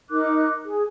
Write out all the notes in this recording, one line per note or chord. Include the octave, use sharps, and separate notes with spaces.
D#4 A#4 D6 F#6
G#4